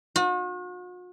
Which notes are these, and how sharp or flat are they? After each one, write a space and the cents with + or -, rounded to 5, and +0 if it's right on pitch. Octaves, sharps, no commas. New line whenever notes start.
F#4 -45